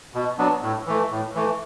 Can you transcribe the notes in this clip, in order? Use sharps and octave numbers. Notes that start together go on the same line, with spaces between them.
B2
F#3 B3 D4
A2
E3 A3
A2
E3 A3